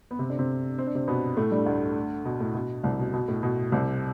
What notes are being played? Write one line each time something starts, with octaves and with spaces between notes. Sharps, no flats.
B3
C3 C4
D3 D4
C3 C4
C4
D4
C3 C4
B2 B3
A2 A3
G2 G3
D2 D3
B2
A2
B2
C2 C3
B2
B2
A2
B2
C2 C3